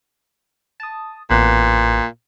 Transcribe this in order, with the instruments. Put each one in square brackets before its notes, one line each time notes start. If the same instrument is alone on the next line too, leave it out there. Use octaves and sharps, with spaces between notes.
[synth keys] A5 D#6
[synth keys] A1 B3 F#6 [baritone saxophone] A#2